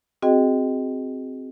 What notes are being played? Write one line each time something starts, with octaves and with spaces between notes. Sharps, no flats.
C4 F#4 G#4 D#5 G5